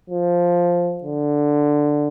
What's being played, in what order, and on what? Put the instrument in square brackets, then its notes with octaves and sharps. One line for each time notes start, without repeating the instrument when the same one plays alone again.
[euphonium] F3
D3